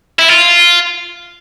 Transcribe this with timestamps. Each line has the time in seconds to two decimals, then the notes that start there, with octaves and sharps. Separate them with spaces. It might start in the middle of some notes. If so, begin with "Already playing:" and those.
0.19 E4
0.29 F4